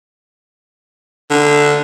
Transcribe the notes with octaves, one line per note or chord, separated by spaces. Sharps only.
D3